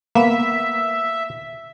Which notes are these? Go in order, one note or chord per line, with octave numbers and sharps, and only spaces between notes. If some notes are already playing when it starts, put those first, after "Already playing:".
A#3 B3 E5